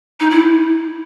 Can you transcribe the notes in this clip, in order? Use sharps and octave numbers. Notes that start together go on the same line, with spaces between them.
D#4
E4